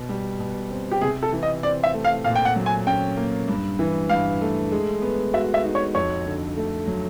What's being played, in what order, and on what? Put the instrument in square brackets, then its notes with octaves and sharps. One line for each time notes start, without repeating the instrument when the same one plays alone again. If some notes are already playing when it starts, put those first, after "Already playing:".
Already playing: [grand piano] B2
G3
B2
C4
[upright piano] G4
[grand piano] C3 [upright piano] G#4
[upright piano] A4
[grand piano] E3
[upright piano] D#5
[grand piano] C4 [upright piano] D5
[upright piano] E5
[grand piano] A3
[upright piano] F5
[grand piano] A#2 [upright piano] F5
[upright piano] G5
F#5
[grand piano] F#3
[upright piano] G#5
[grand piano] C#4 [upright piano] G5
[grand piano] A#3
G2
E3
[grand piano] G2 [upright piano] F5
[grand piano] A3
G#3
B3
[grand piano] F#4 [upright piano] E5
[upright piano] E5
[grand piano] D#4
[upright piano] C#5
[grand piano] F2 [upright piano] C#5
[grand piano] D3
A3
F#3